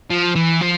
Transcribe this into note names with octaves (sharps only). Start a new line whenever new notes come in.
F3
E3
F3